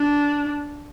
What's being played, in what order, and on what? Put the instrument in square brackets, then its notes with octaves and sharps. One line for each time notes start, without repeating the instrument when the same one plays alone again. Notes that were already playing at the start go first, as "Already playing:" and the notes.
Already playing: [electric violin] D4